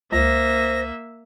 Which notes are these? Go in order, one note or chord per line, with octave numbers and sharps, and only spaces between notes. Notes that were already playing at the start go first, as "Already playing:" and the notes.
C#2 A#3 C5 E5 A#6